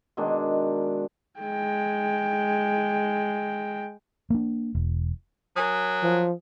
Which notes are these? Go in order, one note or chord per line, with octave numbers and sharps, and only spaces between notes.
B2 D#3 G#3 D4
G#3 G5
A#3 D4
E1
F#3 A#4 G#5 D#6
F3